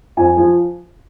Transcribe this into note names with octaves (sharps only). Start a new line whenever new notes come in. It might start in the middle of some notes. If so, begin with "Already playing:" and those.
F2 G#5
F3